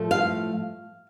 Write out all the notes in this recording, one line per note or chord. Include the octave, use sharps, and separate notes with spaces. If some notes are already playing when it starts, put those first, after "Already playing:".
Already playing: A2 F3 A3
F5